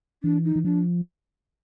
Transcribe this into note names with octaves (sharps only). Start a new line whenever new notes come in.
E3 D4
D#4
E3
F3 D4